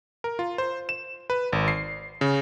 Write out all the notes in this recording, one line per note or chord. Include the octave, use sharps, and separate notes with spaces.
A#4
F4
C5
E7
B4
G#1
C7
C#3